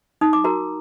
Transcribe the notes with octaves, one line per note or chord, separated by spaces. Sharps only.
D#4 D#6
D6
F#4 A#4 A#5